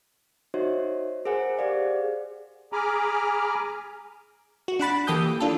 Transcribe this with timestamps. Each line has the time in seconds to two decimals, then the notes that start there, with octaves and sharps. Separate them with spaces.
0.54 D#4 F#4 C5 C#5 D#5 E5
1.25 G#4 A#4 C5 F#5 G#5 C#7
1.57 G4 G#4 C5 D5 F5 F#5
2.73 G#4 G#5 A#5 B5 D6 F6
4.68 F#4
4.80 D4 F#5 B5 A6
5.07 E3 A#3 G4 A4 D#6 G6
5.40 E3 D4 F4 A4